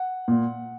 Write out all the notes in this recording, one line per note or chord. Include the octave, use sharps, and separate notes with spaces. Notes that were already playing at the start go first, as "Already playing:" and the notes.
Already playing: F#5
A#2